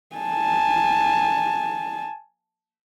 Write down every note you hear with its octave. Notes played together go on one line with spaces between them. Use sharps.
G#5 A5